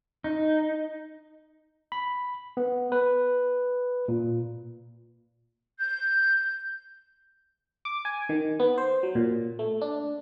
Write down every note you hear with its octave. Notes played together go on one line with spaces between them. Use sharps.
D#4
B5
B3
B4
A#2
G6
D6
G#5
D#3
B3
C5
F#3
A#2
A3
D4